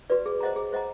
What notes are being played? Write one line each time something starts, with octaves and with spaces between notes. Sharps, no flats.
F#4 B4 D5
G#4
C5 D#5 F#5 A#5
G#4
C5 D#5 F#5 A#5